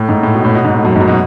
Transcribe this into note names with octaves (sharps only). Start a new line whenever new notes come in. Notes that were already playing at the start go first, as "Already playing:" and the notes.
Already playing: A2
G#2
A2
B2
A2
B2
G#2
A2
F#2
G#2
F#2
B2